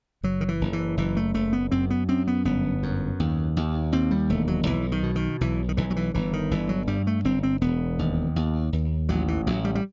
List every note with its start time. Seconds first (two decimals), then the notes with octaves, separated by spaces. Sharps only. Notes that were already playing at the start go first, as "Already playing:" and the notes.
0.23 F#1 F#3
0.41 D#3
0.48 E3
0.61 F#1
0.73 E3
0.97 F#1 E3
1.17 A3
1.34 F#1 A3
1.53 B3
1.71 F#2 C4
1.90 B3
2.08 F#2 C4
2.27 B3
2.45 G1 B3
2.83 F#2
3.20 D#2
3.57 D#2
3.92 D#2 C4
4.11 G3
4.29 E1 A3
4.48 F#3
4.66 B1 E3
4.92 D#3
5.03 B2
5.16 D#3
5.41 B1 E3
5.69 D#3
5.77 B1 E3
5.91 F#3
5.96 E3
6.14 G1 E3
6.33 D#3
6.51 G1 E3
6.69 F#3
6.87 G2 G3
7.07 A3
7.24 G1 C4
7.43 C4
7.61 E1 B3
7.99 D#2
8.36 D#2
8.73 D#2
9.09 A1 F#3
9.28 E3
9.47 A1 F#3
9.65 G3
9.75 G3